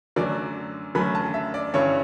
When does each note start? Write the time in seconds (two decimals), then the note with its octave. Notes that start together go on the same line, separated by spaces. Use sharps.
0.16 F#2 D3 F#3 A3 D5
0.95 F#2 D3 F#3 A3 B5
1.15 A5
1.34 E5
1.54 D5
1.74 G2 D3 G3 C#4 E4 C#5